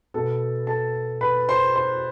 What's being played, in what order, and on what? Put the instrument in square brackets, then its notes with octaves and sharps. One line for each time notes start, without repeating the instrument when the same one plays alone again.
[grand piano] B2 B3 A4 A5
A4 A5
B4 B5
C5 C6
C5 C6